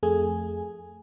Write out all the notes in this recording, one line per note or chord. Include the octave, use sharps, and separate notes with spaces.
F2 A3 G#4 G#5